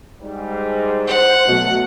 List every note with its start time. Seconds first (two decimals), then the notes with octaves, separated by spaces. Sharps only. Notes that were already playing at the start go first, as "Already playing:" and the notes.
0.21 G#2 G3
1.07 C5 F#5
1.48 B2 F#3 A3